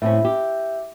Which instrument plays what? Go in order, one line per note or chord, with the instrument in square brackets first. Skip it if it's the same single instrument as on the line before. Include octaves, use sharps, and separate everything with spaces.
[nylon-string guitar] A2 C4 C#4 [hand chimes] E5
[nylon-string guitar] G4